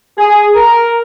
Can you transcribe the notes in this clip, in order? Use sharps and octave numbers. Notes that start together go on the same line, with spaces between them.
G#4
A#4